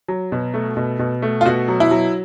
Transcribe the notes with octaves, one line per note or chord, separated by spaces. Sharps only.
F#3
B2
A3
B2
B2
A3
F4
B2 F#4
F#3
E4
F#3